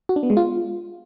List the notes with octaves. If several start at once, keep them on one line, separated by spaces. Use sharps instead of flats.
F#4
D4
B3
G#3
F4